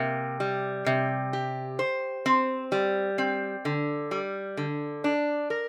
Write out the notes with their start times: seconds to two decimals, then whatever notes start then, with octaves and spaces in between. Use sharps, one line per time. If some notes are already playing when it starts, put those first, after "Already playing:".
Already playing: C3 A#3
0.40 G3
0.86 C3
1.33 G4
1.79 C5
2.26 C4
2.72 G3
3.18 C4
3.65 D3
4.11 G3
4.57 D3
5.04 D4
5.50 A#4